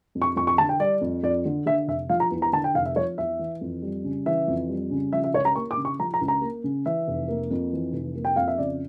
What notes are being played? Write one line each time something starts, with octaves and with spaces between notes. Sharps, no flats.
F2
C#6
F2 C#6
C#6
D3 A5
G5
G3 D5
F2
F2 D5
D3
D3 E5
F1 E5
F3 F5
A#5
E2
A#5
D3 A5
G5
F1 F5
E5
F3 C#5
E2 E5
E3
F2
G3
C#3
E3 E5
F2
G3
C#3
F3 E5
E5
C#2 C#5
A#5
A#3 C#6
D6
C#3
C#6
F3 A#5
A#5
C#2
A#5
A#3
C#3
E3 E5
F1
A#3
F2
E3
F1
A#3
G5
F2 F5
E5
C#3 D5